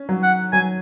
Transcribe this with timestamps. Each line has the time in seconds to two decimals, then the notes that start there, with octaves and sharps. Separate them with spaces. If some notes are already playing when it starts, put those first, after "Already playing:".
Already playing: C#4
0.09 F#3
0.24 F#5
0.53 F#3 G#5